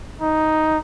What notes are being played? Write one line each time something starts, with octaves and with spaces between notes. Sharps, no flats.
D#4